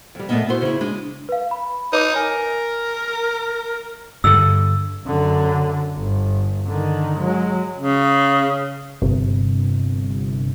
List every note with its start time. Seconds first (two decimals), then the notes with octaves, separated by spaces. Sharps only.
0.15 F2 G3
0.29 A#2 A3 B3 C#4 D#5 E5
0.49 E4 F#4 C5
0.62 C#3 E4
0.81 G#3 D4
1.29 B4 F5
1.51 B5
1.93 D#4 B4 C#5 D6
2.16 A#4 G#5
4.24 G2 D3 E6
5.05 F#2 D3
5.95 G1
6.66 D3 D#3
7.18 F#3 G#3
7.76 C#3
9.02 G1 C3